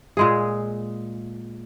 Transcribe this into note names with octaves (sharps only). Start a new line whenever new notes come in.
A#2 G#3 G#4